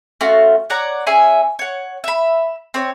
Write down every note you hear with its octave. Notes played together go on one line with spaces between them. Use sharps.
A3 C#4 F4 F#4
C#5 D5 F#5 A#5
C#4 G#4 E5 G#5
C#5 F#5
E5 B5
C4 C#5